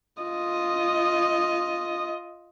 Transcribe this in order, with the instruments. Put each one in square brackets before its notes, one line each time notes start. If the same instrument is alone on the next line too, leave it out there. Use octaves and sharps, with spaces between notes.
[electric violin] F4 D#5